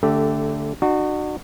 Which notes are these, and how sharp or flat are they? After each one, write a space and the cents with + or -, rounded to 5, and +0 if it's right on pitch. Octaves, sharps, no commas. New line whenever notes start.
D3 -20 A3 +0 G4 +0
D4 +45 F#4 +0